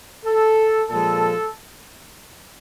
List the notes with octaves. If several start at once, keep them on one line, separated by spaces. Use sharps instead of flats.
A4
A#2 F3 G#3 A4